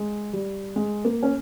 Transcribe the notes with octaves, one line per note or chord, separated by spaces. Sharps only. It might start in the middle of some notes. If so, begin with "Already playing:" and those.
Already playing: G#3
G3
G#3
A#3
C#4